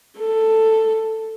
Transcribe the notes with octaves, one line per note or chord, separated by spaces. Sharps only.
A4